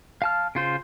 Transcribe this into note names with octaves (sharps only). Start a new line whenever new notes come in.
F5 A5 F6
C#3 F4 C5